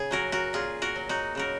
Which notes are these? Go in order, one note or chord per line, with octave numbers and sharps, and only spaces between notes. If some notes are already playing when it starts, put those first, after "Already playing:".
Already playing: C#3 G#4
F#3 F#4 A#4
F#4 A#4
A#2 F4 G#4
F#4 A#4
F#3
D#4 F#4
C#3 F#4 A#4